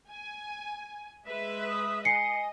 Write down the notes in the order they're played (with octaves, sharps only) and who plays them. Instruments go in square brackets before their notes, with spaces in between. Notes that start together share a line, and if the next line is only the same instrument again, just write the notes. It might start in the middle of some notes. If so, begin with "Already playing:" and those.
[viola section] G#5
G#3 B4 E5
[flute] D#6
[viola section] D#5 [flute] G#5 [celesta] C7 C#7